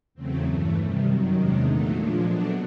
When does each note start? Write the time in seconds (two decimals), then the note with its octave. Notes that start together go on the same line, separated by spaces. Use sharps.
0.14 E2 C#3 F#3 A3 C4
0.44 G2 E3 A3
0.75 C3 D#3 G3
1.04 F#2 D#3 F#3
1.34 E2 C3 D#3 G#3 D4
1.64 A#2 F#3 A3 D#4
1.94 A#2 F3 G#3 D4
2.24 B2 F#3 A3 D4